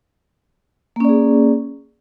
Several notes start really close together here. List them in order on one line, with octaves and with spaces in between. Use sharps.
A#3 C#4 D5 G#4